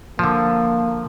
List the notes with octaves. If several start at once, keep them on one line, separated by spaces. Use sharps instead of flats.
D3 F3 A#3